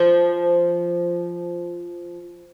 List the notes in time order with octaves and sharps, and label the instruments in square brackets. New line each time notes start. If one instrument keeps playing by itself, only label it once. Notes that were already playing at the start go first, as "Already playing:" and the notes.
Already playing: [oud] F3